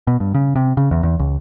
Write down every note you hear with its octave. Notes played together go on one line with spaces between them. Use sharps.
B2
G2
C#3
C3
C#3
E2
E2
C#2